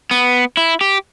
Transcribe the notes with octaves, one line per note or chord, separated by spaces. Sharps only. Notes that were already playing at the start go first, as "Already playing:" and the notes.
B3
E4
G4